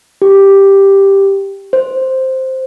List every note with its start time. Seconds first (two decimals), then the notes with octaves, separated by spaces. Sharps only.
0.22 G4
1.73 C5